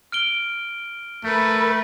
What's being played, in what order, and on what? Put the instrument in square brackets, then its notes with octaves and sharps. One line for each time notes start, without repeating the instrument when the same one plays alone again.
[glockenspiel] F6 D7 G7
[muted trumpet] A3 [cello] A#4 B4